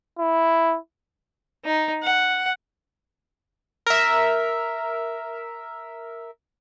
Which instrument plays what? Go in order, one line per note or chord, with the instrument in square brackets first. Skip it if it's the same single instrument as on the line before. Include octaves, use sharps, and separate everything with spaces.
[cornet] E4
[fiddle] D#4
F#5
[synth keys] A#4 E5